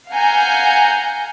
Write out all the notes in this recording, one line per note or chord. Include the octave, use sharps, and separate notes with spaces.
F5 F#5 G#5 A#5 G6